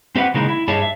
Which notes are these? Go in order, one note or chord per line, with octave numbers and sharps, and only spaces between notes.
C4 G4 B4 F#5
C#3 E3 G#3 A#3 D#4
E4
G2 D#4 G4 G#4 C#5 A5
E5